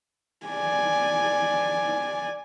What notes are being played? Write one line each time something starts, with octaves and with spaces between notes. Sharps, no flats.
D5 G#5